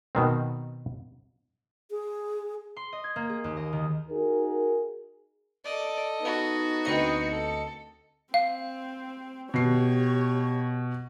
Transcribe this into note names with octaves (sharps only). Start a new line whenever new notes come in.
B2 D#3 C4
G#4
C6
D#5
G#6
A#3
G#4
D#2
D#5
D#3
D#4 F#4 G#4 A#4
A4 D5 D#5
B3 D#4 F#4
D2 C4 B4 D#5 C#7
A4
C4 F5
B2 G4 C#5 C7